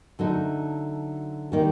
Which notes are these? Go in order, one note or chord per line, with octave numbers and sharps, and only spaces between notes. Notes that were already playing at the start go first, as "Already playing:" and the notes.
D3 F#3 A3 D#4
D#3 G3 A#3 D#4